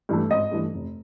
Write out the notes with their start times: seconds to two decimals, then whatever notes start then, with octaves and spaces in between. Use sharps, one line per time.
0.09 G2 E3 A3
0.31 G#1 D#5
0.51 G2 E3 A3
0.74 F1